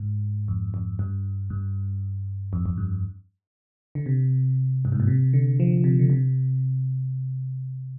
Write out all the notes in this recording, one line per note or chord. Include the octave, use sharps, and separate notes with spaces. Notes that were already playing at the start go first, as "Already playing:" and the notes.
Already playing: G#2
F2
F2
G2
G2
F2
F2
G2
D3
C3
G2
G#2
A#2
C3
D3
F3
C3
D3
C3